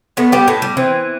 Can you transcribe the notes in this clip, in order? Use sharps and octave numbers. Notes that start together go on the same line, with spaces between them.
A2 A3 B3
G3 G4
A2 A3
G3
E3 C4